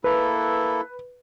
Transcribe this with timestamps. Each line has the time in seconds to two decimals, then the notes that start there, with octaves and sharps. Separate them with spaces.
0.04 A#3 E4 A4 B4